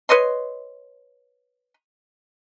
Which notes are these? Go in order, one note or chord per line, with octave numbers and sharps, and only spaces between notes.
B4 C#5 D#5 C6